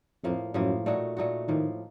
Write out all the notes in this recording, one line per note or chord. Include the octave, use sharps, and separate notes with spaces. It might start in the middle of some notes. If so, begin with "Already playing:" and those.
F2 A2 F3 A#3
F#2 A2 F3 A#3
A#2 A3 D#4 F#4
A#2 A3 D#4 F#4
A2 D#3 F3 A#3